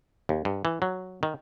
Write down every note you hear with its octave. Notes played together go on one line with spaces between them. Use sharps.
D#2
G2
E3
F#3
D#3